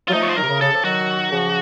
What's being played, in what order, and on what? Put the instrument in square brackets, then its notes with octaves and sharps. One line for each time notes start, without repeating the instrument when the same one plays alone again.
[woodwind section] F#3 [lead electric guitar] F4
[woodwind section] F3 A3 [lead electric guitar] D#4
[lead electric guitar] C#5
C5
[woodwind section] D#3 F#3 [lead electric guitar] A#4
[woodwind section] C3
C#3
[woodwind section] C#3 [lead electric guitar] A4
[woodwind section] C#3 F3
[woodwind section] D#3 F#3 [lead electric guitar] F#4
[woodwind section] C#3 F3